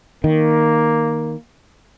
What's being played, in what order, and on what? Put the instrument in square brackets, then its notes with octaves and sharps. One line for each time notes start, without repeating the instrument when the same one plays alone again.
[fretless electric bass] D#3 [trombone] A#3